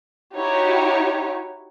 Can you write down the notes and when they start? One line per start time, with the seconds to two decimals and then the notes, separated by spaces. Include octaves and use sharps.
0.37 D#4 E4 F#4 G4 C#5